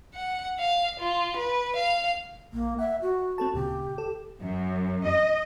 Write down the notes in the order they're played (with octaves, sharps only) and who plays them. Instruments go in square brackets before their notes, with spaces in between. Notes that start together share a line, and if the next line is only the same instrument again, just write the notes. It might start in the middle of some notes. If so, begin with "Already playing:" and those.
[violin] F#5
F5
F4
B4
F5
[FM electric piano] A#1 [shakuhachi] A#3
[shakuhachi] E5 [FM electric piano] F#5
[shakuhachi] F#4
[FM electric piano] C4 A4 A5
[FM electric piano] D2 A#2 C#3 [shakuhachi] G4
[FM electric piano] A4
[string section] F#2
D#5